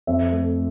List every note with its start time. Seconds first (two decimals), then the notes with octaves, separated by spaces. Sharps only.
0.07 F2 E5
0.32 A3